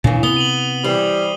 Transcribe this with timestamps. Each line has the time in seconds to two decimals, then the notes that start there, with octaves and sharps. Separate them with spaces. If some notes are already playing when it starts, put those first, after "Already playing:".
0.04 A#2 C#3 E3 D4
0.23 C3 B3 D#6 G7
0.37 D#7 F#7
0.84 E3 G3 C5